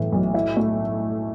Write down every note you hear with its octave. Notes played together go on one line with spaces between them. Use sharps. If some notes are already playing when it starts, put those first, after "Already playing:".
Already playing: B1 A2 E3
B1
E4
A3